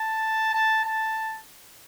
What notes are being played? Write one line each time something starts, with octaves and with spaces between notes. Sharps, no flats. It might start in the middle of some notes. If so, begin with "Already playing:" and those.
Already playing: A5
A5
A5